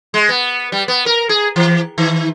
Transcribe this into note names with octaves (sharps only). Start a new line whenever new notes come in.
G#3
B3
G3
B3
A#4
G#4
E3
D#3